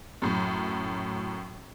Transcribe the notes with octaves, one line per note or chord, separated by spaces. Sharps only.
F#2 A2